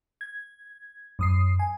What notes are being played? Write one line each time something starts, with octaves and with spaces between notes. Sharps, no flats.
G#6
F#2 D#6 C7
G#5